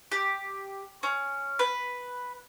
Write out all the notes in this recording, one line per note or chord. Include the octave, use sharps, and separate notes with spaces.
G4
C#4
B4